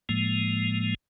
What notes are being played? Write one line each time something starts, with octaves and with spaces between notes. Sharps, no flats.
A2 F3 G#3 A#3